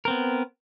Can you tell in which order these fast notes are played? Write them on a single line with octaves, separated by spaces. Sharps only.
A#4 C4 B3